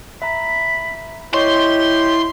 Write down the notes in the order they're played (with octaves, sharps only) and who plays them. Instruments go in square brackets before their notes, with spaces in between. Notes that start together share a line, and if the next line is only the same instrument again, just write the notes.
[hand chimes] E5 A#5 [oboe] B5
[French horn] E4 [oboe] G4 [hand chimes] C#5 D#5 C#6 [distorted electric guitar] C6